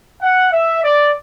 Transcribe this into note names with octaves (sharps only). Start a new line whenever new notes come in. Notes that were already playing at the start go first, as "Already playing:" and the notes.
F#5
E5
D5